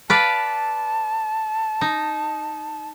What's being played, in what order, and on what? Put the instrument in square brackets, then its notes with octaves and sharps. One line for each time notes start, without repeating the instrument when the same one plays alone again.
[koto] B4 D5 F5 [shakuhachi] A5
[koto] D#4